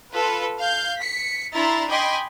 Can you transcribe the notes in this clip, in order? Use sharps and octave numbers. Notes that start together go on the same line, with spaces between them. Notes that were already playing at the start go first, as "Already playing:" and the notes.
F4 A4 B4
F5 G6
B6 C#7
D4 E4 A#5 C6 A6
D#5 G5 G#5 B5 C6 D6